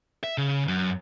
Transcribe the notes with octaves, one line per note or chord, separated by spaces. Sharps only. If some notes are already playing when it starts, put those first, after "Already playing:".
E5
C#3
F#2